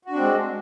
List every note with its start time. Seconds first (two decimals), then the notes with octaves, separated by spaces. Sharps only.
0.05 F#4
0.10 D4
0.15 C4
0.20 G#3